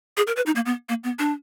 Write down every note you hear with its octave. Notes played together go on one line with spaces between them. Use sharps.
G#4
A#4
B4
D#4
A#3
B3
A#3
B3
D4